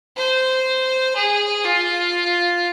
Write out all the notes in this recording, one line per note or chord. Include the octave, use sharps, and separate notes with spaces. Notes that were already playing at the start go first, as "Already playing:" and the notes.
C5
G#4
F4